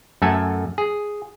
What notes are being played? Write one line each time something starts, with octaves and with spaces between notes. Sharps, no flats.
F#2 A3 A4 G#5
G#4